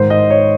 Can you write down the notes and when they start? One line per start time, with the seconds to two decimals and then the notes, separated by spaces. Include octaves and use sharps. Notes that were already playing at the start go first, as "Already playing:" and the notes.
Already playing: G#2 D#3 C5
0.10 D#5
0.30 C#5